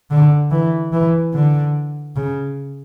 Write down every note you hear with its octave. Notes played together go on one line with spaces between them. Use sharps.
D3
E3
E3
D3
C#3